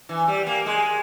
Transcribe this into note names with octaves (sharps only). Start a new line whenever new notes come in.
E3
G3
A#3
G#3